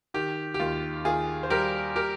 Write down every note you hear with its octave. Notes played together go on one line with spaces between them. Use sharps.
D#3 G4
G4
D#2 F4
D#2 F4 G#4
C5
G3 G4 A#4
G4 A#4